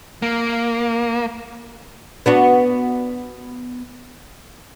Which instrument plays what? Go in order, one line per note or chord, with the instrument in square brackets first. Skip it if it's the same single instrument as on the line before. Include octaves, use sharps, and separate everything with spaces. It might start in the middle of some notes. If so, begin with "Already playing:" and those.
[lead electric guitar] A#3
[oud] B3 D4 F#4